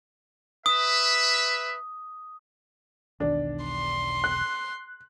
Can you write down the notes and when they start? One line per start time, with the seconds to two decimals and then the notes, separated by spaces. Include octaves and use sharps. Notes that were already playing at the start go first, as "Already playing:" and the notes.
0.66 B4 E5 D#6
3.20 E1 B1 D#3 D4
3.63 C6
4.24 F#6